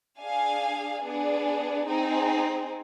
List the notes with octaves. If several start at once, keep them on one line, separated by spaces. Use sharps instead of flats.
D4 G#4 F5 G#5
B3 D4 G#4
C4 D#4 G#4